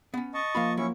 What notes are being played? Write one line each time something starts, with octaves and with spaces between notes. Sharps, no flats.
B3 C#4
D#5 A5 C#6
F3 A#3 F4 F5 A#5 B5
F#3 C#4 E4 C#6